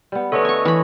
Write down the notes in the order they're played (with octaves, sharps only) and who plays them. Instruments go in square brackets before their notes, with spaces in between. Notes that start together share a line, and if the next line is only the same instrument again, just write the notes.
[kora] G3 B3
[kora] D3 C#4 D#4 [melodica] A3 C#5 D#5 [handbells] A4 B4
[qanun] G#5 C#6
E3 B5